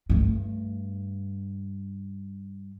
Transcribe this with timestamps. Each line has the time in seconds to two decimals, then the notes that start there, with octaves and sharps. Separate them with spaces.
0.09 G2 A3